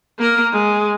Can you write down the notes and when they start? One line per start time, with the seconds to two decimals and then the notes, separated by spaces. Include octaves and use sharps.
0.19 A#3 A#4
0.52 G#3